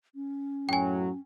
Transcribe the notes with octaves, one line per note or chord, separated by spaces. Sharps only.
C#4
F#2 A2 F#3 G5 G#5